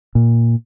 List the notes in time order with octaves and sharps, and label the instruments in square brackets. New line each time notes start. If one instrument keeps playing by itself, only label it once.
[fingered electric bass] A#2